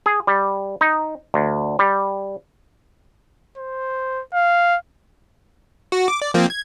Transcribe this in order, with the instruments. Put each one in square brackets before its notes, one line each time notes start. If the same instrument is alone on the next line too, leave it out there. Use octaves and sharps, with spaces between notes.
[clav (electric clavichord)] G#4
G3
D#4
D2
G3
[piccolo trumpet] C5
F5
[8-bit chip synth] F#4
D6
D5
F3 A#3 C4
G#6